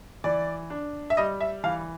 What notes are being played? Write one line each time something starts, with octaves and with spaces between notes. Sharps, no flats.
E3 D5
D4
E5
G3 D#5
E5
E3 F5